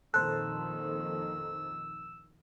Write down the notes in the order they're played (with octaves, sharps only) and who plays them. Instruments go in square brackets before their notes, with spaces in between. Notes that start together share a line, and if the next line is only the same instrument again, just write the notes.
[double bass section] A#1 F2 D#3 [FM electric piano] A4 C5 [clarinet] E6 [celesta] F#6